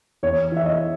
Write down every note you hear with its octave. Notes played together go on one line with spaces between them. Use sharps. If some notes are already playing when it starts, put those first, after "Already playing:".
E2 C#5
E3 E5
D#5